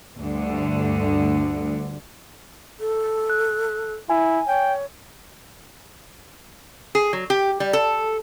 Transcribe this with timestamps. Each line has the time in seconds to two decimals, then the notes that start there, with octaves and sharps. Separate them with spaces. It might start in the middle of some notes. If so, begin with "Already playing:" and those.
0.19 D2 G2 D3
2.80 A4
3.30 F#6
4.10 E4 G#5
4.47 C#5 G5
6.95 G#4
7.13 F#3
7.30 G4
7.60 G3
7.73 A4